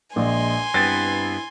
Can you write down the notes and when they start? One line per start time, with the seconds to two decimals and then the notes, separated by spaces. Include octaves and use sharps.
0.16 A#1 G#3 G#5 C6
0.74 G2 B3 C4 E4 A6